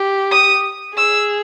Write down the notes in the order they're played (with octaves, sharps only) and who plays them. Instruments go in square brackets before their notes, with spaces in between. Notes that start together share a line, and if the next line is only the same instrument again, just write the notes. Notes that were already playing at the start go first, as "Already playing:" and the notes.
Already playing: [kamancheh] G4
[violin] D#6
[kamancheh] G#4 [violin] E6